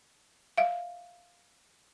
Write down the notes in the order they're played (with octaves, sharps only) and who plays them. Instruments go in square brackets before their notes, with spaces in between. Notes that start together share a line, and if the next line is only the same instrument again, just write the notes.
[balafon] E5 F5